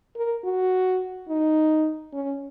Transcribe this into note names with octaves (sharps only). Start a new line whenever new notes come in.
A#4
F#4
D#4
C#4